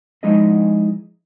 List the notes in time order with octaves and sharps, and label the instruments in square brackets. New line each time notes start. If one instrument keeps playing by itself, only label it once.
[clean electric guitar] F3 G#3 D#4 E4 G#4 D#5